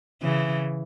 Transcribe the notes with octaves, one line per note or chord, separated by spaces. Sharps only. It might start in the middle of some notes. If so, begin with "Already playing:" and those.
C#3 E3